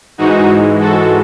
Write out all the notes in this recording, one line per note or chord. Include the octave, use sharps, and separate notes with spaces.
G#2 E3 G#3 D#4 F#4
F#4 A4